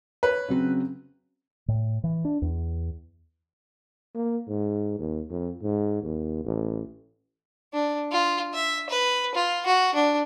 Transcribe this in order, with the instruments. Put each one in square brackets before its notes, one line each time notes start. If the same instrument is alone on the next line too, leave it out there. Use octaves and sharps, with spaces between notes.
[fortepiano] B4 [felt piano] C#5
[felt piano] C#3 F#3 C4
[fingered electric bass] A2
E3
D4
E2
[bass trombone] A#3
G#2
D#2
F2
G#2
D#2
A1
[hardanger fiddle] D4
F4
E5
B4
F4
F#4
D4